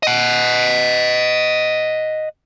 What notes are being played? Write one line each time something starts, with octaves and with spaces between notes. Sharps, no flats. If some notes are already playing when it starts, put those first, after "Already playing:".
D#5 F#5